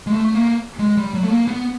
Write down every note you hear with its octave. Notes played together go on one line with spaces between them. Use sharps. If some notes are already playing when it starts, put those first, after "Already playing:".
G#3
A3
A3
A#3
G#3
G3
F#3
A3
A#3
B3